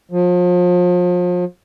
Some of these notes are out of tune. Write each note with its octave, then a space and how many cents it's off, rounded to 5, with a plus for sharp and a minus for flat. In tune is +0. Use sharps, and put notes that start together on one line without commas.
F3 +35